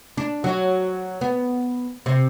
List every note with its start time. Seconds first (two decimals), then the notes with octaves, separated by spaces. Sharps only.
0.17 D4
0.44 F#3
1.21 B3
2.06 C3